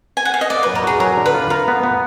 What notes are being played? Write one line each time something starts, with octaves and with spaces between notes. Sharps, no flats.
G#5
F#5
F5
D#5
A#3 D5
F#3 B4
A#4
F#4 G#4
F#3 A#4
D3
B4
F4
F4 A#4
B3
B3